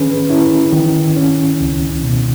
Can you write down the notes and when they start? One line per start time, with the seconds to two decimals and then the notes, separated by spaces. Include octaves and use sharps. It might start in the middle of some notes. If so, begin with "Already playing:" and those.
Already playing: D#3 C#4 G#4 B4
0.30 C#4 E4
0.73 D#3
1.17 C#4
1.61 C#2
2.03 B2